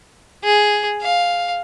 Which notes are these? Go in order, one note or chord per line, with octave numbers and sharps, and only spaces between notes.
G#4
F5